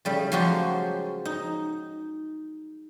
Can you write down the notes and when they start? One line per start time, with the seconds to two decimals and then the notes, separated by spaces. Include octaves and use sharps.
0.05 C#3 G3 A3
0.32 F3 F#3 G#3 F#4 G4
1.25 D#4